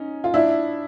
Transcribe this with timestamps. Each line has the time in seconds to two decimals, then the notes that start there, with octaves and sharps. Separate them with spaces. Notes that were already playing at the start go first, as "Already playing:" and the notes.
Already playing: C#4 D#4
0.24 F4
0.34 D4 E4